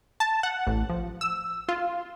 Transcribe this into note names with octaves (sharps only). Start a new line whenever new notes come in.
A5
F#5
A1
F3
E6
F4